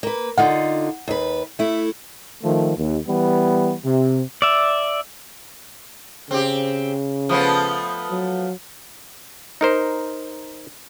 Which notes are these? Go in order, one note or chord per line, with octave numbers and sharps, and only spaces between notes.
A#3 B4
D3 D#4 F4 F#5
D#2 B4
A3 E4
D#3 F3 A3
D#2
E3 G3 B3
C3
D5 E5
C#3 C4 G4
F3 A3 B3 B4 B5 D#6
F#3
D#4 A#4 C5